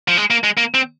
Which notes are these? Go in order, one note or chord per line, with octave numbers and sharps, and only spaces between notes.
F3
G#3
A#3
G#3
A#3
C4